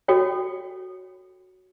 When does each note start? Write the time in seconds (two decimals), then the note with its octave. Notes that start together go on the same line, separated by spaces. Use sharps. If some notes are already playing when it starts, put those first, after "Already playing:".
0.08 F#4 A4 C#5 G5